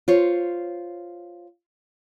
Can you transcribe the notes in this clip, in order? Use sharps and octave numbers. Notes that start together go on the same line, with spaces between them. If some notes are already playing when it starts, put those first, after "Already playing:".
F4 C5 C#5